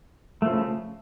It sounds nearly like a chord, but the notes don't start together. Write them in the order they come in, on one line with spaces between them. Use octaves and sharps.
A3 F3 C#3